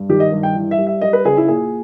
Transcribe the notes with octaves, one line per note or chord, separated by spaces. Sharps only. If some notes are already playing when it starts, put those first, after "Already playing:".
Already playing: G2
D#3 G4
D#5
G2
G5
E3
E5
G3
E5
G3 D#5
B4
C#3 G#4
E4
A#2 G#4